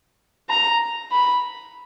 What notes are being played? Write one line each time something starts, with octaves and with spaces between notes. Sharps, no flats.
A#5
B5